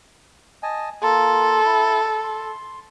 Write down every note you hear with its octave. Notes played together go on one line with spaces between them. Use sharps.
D#5 G#5 A5
A#3 F4 A4
E4
C6